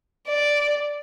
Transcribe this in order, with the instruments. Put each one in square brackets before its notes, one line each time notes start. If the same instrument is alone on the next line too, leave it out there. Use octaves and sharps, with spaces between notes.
[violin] D5